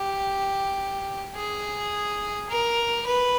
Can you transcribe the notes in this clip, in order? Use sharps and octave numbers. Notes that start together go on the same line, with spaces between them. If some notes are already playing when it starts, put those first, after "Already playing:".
Already playing: G4
G#4
A#4
B4